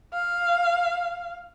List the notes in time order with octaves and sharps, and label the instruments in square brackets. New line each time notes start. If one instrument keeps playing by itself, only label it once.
[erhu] F5